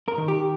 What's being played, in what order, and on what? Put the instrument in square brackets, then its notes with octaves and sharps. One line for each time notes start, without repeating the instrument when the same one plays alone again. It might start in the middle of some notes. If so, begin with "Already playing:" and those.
[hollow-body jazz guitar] A#4
D#3
G4